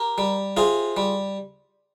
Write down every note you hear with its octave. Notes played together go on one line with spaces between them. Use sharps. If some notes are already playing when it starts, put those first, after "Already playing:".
Already playing: G4 A#4
G3
C3 F4 G#4
G3